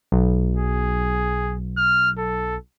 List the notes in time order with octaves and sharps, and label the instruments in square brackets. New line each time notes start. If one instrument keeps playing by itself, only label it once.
[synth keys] B1
[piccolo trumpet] G#4
F6
A4